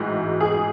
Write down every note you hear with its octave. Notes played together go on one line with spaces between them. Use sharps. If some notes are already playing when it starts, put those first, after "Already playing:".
Already playing: A1 G#2 E3 F#4
G#4